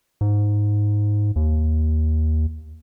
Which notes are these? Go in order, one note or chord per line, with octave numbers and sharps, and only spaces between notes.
G#2
D#2